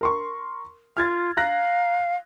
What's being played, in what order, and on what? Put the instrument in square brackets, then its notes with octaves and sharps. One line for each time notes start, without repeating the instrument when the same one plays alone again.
[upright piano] A#4 C6 C#6
[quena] F4 [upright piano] F6 G#6 A6
[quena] F5 [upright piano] A#5 F#6 A#6